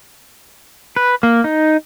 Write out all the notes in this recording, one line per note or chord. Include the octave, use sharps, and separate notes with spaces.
B4
A#3
D#4